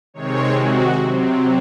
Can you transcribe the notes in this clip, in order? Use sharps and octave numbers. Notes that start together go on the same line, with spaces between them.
C3 D#3 G#3 C4 C#5
F#4
C3 F#3 C4